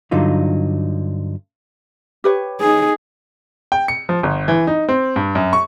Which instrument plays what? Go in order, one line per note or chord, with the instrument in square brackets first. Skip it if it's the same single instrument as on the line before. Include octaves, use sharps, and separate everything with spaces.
[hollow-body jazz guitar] G2 D3 F#3 D#4 F4
[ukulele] G4 B4 C#5
[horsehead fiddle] D#4 G#4
[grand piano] G5
C#7
F3
G1
E3
D#4
C4
G2
F#2
C#6